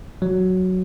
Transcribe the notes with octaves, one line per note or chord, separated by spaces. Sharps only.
F#3